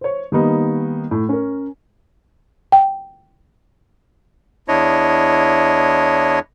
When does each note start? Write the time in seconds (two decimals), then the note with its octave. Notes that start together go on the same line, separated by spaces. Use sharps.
0.01 C5 C#5
0.32 D#3 G3 A#3 B3 D#4
1.11 A2
1.29 C#4 A#4
2.72 G5
4.68 E2 D4 E4 C#5 D#5